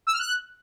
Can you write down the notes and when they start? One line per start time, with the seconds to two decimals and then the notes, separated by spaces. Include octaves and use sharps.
0.07 E6
0.13 F6
0.19 F#6